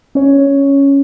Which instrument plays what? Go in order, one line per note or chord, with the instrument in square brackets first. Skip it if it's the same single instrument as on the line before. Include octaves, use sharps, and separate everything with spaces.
[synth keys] C#4 C#5